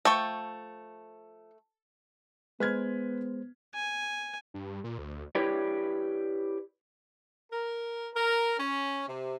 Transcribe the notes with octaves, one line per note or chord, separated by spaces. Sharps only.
F3 A3 G5 C#6
G#3 B3 B4 C5 F6 G#6
G#5
G2
A#2
D2
E4 G4 B4 C#5 D5
A#4
A#4
C#4
C3